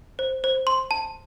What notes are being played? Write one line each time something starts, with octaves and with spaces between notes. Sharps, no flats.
C5
C5
C6
A5